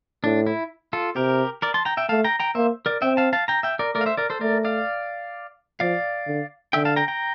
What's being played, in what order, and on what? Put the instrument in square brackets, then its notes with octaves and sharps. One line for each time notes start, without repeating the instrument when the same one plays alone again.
[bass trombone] A2 [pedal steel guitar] D4
[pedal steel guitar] E4
F4 A4
[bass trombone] C3 [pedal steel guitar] G4 A#4
[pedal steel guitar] A#4 D5
A5 C6
G5 A#5
E5 G5
[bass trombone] A3 [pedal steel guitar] F5 A5
[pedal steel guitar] G5 A#5
G5 A#5
[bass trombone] A#3 [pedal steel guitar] C5 E5
[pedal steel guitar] A#4 D5
[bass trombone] C4 [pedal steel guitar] E5 G5
[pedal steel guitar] F5 A5
F5 A5
G5 A#5
E5 G5
A#4 D5
[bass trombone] A3 [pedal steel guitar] A#4 D5
[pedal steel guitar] F5
C5 E5
A#4 D5
A4 C5
[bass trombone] A3 [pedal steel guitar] A#4 D5
[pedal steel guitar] D5 F5
[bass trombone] F3 [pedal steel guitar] D5 F5
[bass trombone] D3
[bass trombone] D3 [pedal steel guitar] E5 G5
[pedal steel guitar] F5 A5
G5 A#5
G5 A#5